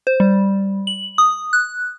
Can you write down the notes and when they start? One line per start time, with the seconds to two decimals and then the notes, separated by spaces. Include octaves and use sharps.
0.07 C5
0.20 G3
0.87 F#7
1.18 D#6
1.53 F#6